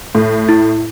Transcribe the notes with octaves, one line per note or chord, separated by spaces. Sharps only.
A2
E4